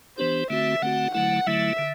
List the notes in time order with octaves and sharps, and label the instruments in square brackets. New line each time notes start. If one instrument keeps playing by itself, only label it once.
[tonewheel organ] E3 B3 D4 G4 [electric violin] C5
[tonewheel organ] D3 A3 C4 F#4 [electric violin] E5
[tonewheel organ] D3 A3 C4 F#4 [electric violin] F#5
[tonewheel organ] D3 F#3 A3 E4 [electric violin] F#5
[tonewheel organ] D3 F#3 A3 E4 [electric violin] E5
[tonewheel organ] D3